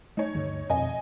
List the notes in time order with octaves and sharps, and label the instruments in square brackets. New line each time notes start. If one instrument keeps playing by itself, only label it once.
[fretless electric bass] A3 [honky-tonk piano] D#4 C#5
[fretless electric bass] D2 G2 D3
[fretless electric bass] F2 B2 [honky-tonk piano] D#5 G#5